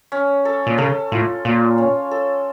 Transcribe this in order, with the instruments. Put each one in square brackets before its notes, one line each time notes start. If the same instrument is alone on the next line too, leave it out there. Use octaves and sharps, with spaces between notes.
[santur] C#4
A4
[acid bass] A#2
[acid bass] C#3 [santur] A4
[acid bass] A2 [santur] F4
[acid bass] A#2 [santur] F4
[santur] C#4
A4